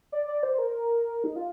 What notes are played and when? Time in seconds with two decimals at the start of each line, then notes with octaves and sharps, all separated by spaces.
0.12 D5
0.28 D5
0.43 C5
0.58 A#4
1.24 D#4
1.36 F4